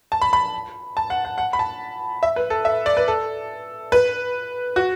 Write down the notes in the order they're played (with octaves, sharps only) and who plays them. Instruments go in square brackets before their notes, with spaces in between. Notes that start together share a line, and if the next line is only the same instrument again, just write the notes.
[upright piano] A5
B5
B5
A5
F#5
F#5
F#5
B5
A5
E5
B4
A4
E5
D5
B4
A4
B4
F#4